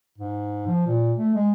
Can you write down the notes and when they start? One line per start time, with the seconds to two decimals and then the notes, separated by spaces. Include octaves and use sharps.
0.18 G#2
0.67 F3
0.86 A#2
1.17 A3
1.35 G#3